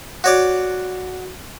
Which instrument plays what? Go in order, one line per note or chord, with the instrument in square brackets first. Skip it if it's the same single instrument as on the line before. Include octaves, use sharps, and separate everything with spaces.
[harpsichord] F#4 C#5 D5